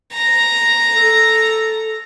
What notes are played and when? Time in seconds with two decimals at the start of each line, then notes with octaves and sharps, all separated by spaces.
0.13 A#5
0.93 A4